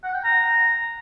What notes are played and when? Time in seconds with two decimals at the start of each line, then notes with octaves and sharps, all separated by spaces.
0.04 F#5
0.14 G5
0.24 A#5